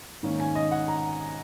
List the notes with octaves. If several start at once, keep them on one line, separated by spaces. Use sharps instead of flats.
G#2 D#3 A#3 C#4
G#5
D#5
F#5
A#5